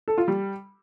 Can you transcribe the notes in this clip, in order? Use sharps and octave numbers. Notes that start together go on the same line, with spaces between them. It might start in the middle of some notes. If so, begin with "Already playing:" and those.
A4
F4
G3